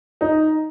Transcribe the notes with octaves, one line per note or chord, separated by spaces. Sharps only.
D#4